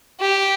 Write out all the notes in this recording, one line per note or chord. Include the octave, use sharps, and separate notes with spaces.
G4